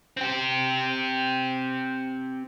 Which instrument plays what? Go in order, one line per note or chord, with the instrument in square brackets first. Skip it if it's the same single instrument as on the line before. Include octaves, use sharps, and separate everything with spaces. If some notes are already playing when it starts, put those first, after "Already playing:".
[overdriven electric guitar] C4 G4